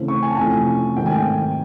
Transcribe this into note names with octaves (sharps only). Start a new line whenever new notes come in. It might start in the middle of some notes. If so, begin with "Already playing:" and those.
Already playing: C#3 E3 A3 C4
C#6
G#5
A5
F2 C3 E3 A3 C#4 G#5
G#2 D#3 F#3 A3 C4 G5
G#5
G5